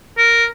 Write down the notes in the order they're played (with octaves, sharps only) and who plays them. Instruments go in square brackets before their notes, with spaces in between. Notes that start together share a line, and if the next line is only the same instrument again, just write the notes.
[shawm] A#4